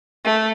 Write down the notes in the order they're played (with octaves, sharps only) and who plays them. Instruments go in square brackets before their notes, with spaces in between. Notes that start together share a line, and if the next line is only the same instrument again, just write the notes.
[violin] A3